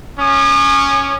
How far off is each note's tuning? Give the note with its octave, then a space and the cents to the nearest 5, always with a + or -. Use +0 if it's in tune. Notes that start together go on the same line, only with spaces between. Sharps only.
C#4 +0 D#6 -45